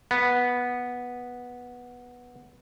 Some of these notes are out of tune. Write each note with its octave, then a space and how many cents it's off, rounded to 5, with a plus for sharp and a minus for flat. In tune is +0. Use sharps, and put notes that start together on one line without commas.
B3 -10